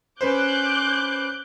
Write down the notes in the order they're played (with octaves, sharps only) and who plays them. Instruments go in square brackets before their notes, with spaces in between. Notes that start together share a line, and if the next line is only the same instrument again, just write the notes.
[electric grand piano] C#4 B4 C5 [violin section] D6 F#6 G6